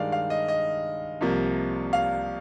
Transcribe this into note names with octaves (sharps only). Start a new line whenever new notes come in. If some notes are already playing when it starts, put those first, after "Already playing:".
Already playing: G2 D#3 G#3 D5 F5
F5
D#5
D#5
C2 C3 F3 A#3
F5